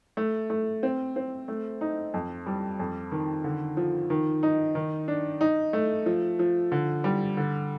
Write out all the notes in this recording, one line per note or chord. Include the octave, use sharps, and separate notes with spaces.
A3
A3
C4
C4
A3
D#4
F2
G3
F2
D#3
D3
F3
D#3
D#4
D#3
D4
D#4
A3
F3
F3
D3
G3
D3